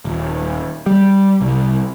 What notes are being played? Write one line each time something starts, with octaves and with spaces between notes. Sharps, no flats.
D#1
G3
C2